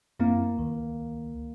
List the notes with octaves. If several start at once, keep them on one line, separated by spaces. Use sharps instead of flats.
F#2 A#3 C4 E4
C#2 D#3